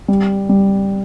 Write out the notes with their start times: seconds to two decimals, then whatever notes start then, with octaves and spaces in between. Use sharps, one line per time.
0.08 G3
0.49 G3